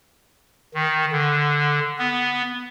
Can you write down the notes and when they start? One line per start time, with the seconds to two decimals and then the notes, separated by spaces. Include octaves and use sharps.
0.74 D#3
1.12 D3
1.99 B3